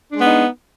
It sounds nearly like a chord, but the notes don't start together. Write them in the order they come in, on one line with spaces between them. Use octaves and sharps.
D4 G#3 B3 D#4